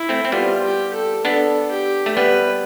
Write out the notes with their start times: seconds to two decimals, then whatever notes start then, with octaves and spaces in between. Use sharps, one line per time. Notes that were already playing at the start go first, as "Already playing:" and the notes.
Already playing: E4
0.09 A3 C4
0.25 C4
0.32 G3 B3 F4
0.63 G4
0.93 A4
1.24 B3 D4 A4
1.71 G4
2.06 A3
2.16 G3 B3 B4